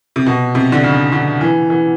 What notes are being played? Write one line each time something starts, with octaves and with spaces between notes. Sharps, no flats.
C3
B2
C3
D3
C#3
D3
E3
E3